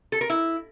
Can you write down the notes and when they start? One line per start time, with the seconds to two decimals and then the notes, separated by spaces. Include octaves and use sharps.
0.12 A4
0.21 A#4
0.30 E4